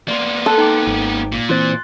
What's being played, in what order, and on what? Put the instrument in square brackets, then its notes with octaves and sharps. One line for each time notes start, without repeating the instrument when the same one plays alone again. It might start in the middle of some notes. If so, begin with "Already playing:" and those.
[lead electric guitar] A#3 B3 [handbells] D5 C6
[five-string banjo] A4 [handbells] C6 F#6
[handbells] D#4 G5 D6
[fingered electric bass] G#1
[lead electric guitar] A#2
[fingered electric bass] E3 C4 [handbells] C6 F#6 A6